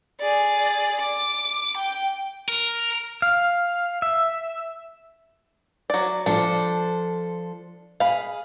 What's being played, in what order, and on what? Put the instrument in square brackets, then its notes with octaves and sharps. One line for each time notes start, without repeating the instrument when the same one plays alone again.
[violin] G#4 D5
D6
G5
[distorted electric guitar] A#4
[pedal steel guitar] F5
E5
[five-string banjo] F#3 D5
[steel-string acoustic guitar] F3 A4 C5 [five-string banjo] D4
[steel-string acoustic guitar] G#4 [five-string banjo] F5 B5